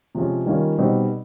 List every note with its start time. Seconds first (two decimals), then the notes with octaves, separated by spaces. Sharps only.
0.15 C3 F3 G#3 C#4
0.46 D#3 G3 A#3 C#4 F4
0.78 B2 G3 C4 D#4